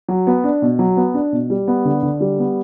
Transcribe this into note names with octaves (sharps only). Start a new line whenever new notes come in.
F#3
B3
D4
B2
F#3
B3
D4
B2
G3
B3
D3
D3
G3
B3